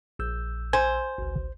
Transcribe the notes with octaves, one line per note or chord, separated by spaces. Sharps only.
A#1 E6 G6
C5 G#5
G#1 C#2